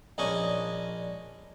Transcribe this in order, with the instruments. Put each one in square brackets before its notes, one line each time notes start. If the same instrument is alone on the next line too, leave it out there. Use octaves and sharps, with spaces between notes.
[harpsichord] A#1 C#4 D4 D#5 C#6